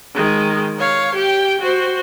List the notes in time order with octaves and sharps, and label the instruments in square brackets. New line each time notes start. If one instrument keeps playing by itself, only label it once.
[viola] D#3 G#3
C#5 F5
G4 G5
F#4 C5